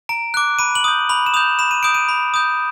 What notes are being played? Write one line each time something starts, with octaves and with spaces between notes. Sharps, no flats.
A#5 D7
D6 F#6
B5 D#7
F#7
D#6 G6
B5 F#7
E7
D#6 G6 F7
B5 E7
D#7
D#6 G6 D7
D#7
B5
D#6 G6